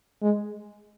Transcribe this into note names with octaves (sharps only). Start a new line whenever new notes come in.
G#3